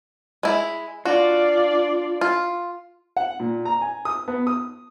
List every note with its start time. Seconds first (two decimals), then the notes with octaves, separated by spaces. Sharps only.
0.43 G#3 E4
1.05 D4 F4 F#4 D5
2.21 F4
3.17 F#5
3.40 A#2
3.65 A#5
3.81 G#5
4.05 D#6
4.28 B3
4.47 D#6